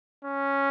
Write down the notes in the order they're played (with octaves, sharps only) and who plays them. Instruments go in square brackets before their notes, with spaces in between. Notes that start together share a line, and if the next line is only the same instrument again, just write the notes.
[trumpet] C#4